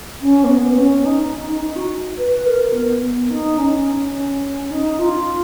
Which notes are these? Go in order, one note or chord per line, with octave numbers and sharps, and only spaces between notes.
C#4
A#3
B3
B3
C#4
D#4
D#4
D#4
F#4
B4
A#4
B3
B3
D#4
C#4
D#4
F4